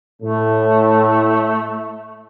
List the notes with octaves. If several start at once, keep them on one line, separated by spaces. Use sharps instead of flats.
A2 A3